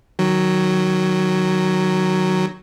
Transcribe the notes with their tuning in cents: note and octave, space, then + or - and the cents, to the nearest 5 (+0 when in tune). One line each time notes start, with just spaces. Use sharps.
D#3 -10 F#3 +5